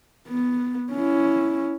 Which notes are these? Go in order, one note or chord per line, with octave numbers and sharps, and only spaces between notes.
B3
C#4 E4